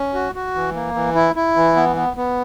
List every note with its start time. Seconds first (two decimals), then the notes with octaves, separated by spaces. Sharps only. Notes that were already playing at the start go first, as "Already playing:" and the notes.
Already playing: C#4
0.14 F#4
0.35 F#4
0.55 E3
0.75 A#3
0.95 E3
1.15 E4
1.36 E4
1.56 E3
1.76 B3
1.96 B3
2.17 B3